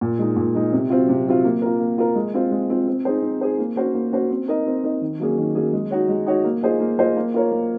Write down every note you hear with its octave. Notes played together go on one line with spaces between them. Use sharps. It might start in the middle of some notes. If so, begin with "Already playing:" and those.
A#2
G#3 D#4
A#2
G#3 D#4
C3
F#3 C4 F4
C3
F#3 C4 F4
A#3
F4 A#4
A#3
F4 A#4
G#3
C4 F4
G#3
C4 F4
C4
D#4 G#4 C5
C4
D#4 G#4 C5
A#3
C#4 F#4 C5
A#3
C#4 F#4 C5
C4
D#4 A#4 D#5
C4
D#4 A#4 D#5
D#3
F#3 A#3 C#4 G#4
D#3
F#3 A#3 C#4 G#4
G#3
D#4 F#4 C#5
G#3
D#4 F#4 C#5
A#3
F4 G#4 C5 D#5
A#3
F4 G#4 C5 D#5
A#3
F4 A#4 C#5
A#3